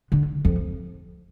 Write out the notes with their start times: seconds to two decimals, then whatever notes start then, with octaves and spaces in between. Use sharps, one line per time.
0.12 D3
0.45 F2